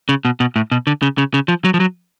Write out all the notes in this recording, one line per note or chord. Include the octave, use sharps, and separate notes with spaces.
C#3
B2
B2
A2
B2
D3
C#3
C#3
C#3
F3
F#3
F3
F#3